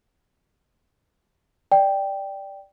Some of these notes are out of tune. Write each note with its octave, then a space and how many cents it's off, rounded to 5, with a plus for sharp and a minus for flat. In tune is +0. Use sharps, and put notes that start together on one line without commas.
D5 +0 G5 +0